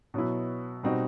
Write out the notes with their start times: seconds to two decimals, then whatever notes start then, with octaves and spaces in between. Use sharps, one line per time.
0.14 B2 F#3 B3 E4
0.83 B2 G3 C4 D#4 F#4